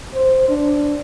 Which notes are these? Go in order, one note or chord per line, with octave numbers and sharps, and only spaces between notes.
C5
D4